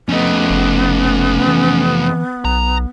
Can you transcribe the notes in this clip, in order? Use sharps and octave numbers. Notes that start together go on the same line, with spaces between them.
F2 A3 B3 C#4 D#5
F#1
E3
B1 A#5